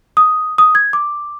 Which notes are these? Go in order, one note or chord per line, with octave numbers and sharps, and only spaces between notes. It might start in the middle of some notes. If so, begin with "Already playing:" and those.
D#6
D#6
G#6
D6